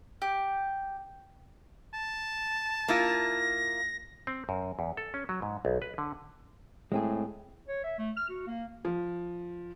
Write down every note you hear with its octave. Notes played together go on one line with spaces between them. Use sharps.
G4
A5
A#3 E4 F4 A#6
C4
F#2
E2
A4
C#4
F#3
G#2
B1
B4
D3
A2 G#3 C4 G#4
C#5
E5
A3
F6
F#4
A#3
F3